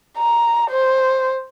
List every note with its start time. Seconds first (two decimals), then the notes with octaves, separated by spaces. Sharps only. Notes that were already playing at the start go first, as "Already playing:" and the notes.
0.18 A#5
0.71 C5